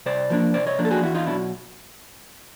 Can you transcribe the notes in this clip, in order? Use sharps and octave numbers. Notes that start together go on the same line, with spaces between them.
C3 C5 D5
F3 A#3 D4
C3 C5 D5
C#5 D#5
F3 A#3 D4
A4
F#4 G#4
E2 E4 F#4
D#4 F4
B2 F#3 D4 E4